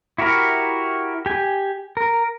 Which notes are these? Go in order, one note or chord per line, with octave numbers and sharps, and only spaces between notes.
E4 F#4 G4 A#4
G4 G#5
A#4